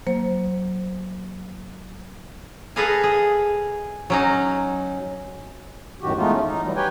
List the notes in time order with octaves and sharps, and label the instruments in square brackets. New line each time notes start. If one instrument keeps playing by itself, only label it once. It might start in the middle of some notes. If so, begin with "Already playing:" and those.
[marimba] F#3 A#3 C5
[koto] G#4 A4 B4 D#5 F5 G#5
G#4
F#3 C#4 D#4
[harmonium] F#2 A2 D#3 F#4 G4
E3 G#3 A3 B3 D#4 F4
C#4
D#4
E3 F#3 G3
G4 B4 C#5 G5 G#5